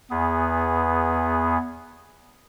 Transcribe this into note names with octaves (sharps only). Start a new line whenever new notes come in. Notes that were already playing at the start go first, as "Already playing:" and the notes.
E2 B3 G#4